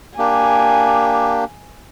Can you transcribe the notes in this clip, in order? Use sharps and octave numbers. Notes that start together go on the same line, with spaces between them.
A#3 D4 G4 G#5